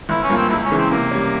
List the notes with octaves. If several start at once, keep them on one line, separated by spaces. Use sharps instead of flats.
G1 E4
C#4
G2 F3 A#3
C4
C#2 E4
C#4
C#3 E3
C4
C3 A#3
G3 C#4